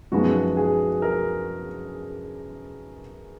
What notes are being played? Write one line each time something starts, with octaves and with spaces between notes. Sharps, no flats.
F#2 F3 G#3 B3 D#4 F#4
G#4
A#4